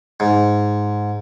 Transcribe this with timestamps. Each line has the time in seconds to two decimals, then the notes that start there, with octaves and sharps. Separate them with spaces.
0.20 G#2